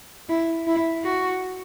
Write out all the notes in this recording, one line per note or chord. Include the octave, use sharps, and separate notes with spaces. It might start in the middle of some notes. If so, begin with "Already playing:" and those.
E4
E4
F#4